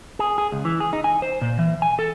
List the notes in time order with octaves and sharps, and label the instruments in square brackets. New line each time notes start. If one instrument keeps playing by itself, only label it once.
[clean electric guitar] G#4
G#4
C#2
E3
G#4
D#4
G#5
C5
A#2
E3
G#5
A4